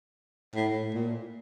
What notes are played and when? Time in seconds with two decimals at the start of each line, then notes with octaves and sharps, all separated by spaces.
0.55 A2
0.94 A#2